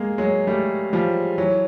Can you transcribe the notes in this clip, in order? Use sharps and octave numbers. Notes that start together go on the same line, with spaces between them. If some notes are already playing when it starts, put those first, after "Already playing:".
Already playing: G#3 A#3
F#3 G#3
G3 A3
F3 G3
E3 F#3